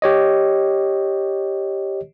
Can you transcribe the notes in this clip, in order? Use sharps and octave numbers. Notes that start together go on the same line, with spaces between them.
G4 C#5 D#5